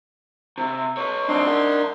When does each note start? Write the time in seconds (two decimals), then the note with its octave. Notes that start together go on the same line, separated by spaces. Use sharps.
0.58 C3
0.97 B4 C#5
1.28 F#2 C4 D4 D#4 C6
1.47 A#4 F#5